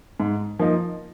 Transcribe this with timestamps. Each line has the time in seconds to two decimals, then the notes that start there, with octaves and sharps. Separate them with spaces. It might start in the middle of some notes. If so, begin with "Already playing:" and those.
0.20 G#2
0.59 F3 A#3 D#4